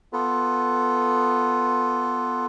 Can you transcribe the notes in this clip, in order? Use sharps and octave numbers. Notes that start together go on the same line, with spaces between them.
B3 F4 A4 B4